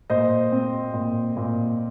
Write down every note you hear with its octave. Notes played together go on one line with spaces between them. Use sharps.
A#2 C5 D#5
C4
A#2
A#2